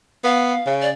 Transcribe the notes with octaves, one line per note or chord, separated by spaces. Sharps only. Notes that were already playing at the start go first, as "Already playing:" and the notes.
B3 F5
C#3
D5